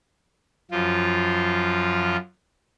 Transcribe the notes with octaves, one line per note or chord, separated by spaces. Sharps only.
F#2 F3 F4